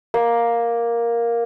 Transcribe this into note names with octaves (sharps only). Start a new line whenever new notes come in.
A#3